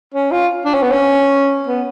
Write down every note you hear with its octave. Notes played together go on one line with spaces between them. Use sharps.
C#4
F4
D4
C#4
B3
C#4
B3